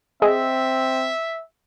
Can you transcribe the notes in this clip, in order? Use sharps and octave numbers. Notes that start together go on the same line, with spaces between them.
C4 G#4 D#5 E5